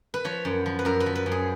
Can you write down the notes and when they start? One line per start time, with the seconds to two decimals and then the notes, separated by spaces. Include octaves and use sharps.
0.14 B4
0.25 F3 C#5
0.45 F#2
0.66 F3
0.79 B4
0.85 F#2 A#4
1.00 B4
1.06 F3
1.16 B4
1.26 F#2
1.32 G#4